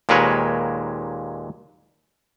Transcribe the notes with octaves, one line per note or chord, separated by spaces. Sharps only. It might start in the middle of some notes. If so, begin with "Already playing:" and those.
D#2 A#2 G#3 A#4 B4 C#5